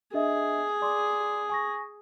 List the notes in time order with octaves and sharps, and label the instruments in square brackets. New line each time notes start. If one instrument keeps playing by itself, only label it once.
[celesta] D4 D#5 E5 [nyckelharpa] G#4
[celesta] D5 C6 D6
G#5 C#6 A#6